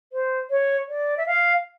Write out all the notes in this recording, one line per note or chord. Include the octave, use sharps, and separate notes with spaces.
C5
C#5
D5
E5
F5